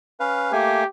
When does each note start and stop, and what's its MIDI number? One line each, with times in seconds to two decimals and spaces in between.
0.20 0.52 61
0.20 0.52 71
0.20 0.52 77
0.52 0.84 57
0.52 0.84 58
0.52 0.86 67
0.52 0.84 80